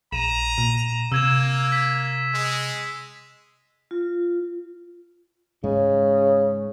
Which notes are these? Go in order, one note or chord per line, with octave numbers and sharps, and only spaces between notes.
A#1 A#5 D#7 E7
A#2
C3 A#3 E6 G#6 E7
B6
G#3
F4
G#2 C#3 G#3